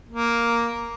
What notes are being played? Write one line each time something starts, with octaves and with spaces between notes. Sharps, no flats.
A#3